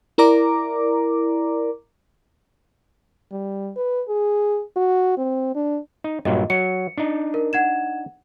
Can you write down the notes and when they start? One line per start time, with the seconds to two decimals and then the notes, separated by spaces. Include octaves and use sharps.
0.18 E4 A#4 D5 A#5 D6
3.31 G3
3.76 B4
4.08 G#4
4.76 F#4
5.17 C4
5.55 D4
6.04 D#4
6.25 G2 A#2 F#3 D#5
6.50 F#3 C#7
6.98 D4 D#4
7.34 A#4
7.53 F#5 G#6 E7